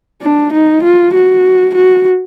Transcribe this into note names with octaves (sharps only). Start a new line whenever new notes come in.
D4
D#4
F4
F#4
F#4